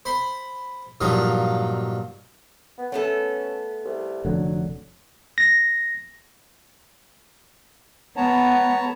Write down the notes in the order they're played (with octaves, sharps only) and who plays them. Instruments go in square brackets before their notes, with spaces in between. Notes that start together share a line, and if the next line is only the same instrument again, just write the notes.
[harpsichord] C5 B5 C6
G2 A#2 F3 F#3 D#4
[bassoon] B3
[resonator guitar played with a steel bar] A3 B3 A4 [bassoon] C#4
[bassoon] C2
[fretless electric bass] F1 D3 [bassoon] F#3
[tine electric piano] A#6
[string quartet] B3 [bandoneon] C#5 A5 A#5 [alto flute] F#5